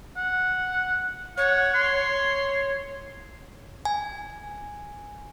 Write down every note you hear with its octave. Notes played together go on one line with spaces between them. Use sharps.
F#5
C#5 F#5
C6
G#5